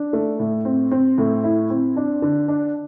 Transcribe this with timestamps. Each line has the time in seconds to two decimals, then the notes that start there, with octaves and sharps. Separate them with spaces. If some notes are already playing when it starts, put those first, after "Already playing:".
Already playing: D4
0.13 A3
0.39 A2
0.65 C4
0.91 C4
1.18 A2
1.44 E4
1.70 C4
1.96 D4
2.22 D3
2.48 D4